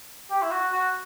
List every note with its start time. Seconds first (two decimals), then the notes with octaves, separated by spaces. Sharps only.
0.30 G4
0.42 E4
0.51 F#4
0.72 F#4